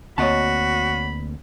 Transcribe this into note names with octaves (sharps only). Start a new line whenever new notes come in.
D2 A#3 C4 F#4 C#5 D#5 A5 B5